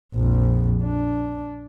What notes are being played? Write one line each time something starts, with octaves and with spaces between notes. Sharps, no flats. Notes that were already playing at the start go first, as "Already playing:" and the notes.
A#1 F2
D4